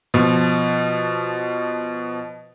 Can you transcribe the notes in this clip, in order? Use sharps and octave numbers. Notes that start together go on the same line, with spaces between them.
B2 F3